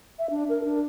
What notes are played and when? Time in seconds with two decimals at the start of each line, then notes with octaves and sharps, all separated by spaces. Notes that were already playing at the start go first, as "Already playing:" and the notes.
0.19 E5
0.30 D4
0.49 A#4
0.64 D4